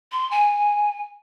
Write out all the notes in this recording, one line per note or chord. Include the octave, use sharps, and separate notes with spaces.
C6
G#5